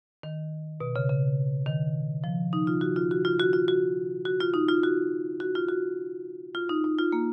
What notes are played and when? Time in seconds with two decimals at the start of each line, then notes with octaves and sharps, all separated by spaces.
0.23 D#3
0.80 B2
0.96 C#3
1.09 C#3
1.66 D#3
2.24 F3
2.53 D#4
2.67 F4
2.81 F#4
2.96 F4
3.11 F#4
3.25 F4
3.40 F#4
3.53 F4
3.68 F#4
4.25 F#4
4.40 F4
4.54 D#4
4.69 F4
4.83 F#4
5.40 F#4
5.55 F4
5.69 F#4
6.55 F4
6.69 D#4
6.84 D#4
6.99 F4
7.12 A#3